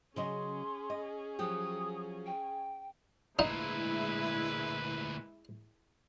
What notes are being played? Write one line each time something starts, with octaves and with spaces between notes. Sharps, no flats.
C#3 F#3 C#4 G#4 D#5 C6
D#5
F3 F#3 G4 D#6
G5
D2 A#2 G#3 D#4 E4 B4